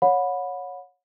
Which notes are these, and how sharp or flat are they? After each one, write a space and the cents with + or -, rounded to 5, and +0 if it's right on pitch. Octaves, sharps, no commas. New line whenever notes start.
C#5 +0 F#5 -35 B5 +0